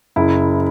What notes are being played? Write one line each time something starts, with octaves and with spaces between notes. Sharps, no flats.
F#1 E4